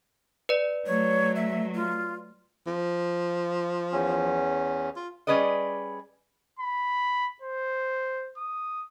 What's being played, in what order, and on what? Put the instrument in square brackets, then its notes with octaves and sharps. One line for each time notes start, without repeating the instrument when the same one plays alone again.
[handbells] B4 D5
[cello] F#3 A3 [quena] C#5
[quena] E5
F4
[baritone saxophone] F3
[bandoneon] E2 C#4
[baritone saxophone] F4
[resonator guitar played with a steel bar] G3 C#4 G#4 B4 D5 D#5
[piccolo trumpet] B5
C5
D#6